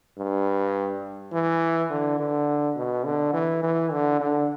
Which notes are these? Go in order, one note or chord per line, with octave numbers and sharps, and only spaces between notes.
G2
E3
D3
D3
B2
D3
E3
E3
D3
D3